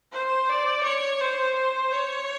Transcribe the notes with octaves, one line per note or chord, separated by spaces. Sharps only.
C5
D5
C#5
C5
C5
C#5